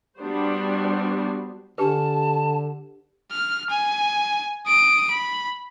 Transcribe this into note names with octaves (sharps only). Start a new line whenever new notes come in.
G3 B3 D4 F#4 C5
D3 D4 G4 B4 A5
F6
G#5
D#6 D7
B5